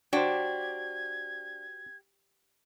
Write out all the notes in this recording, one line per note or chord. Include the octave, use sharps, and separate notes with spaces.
D4 F#4 G4 C5 G#6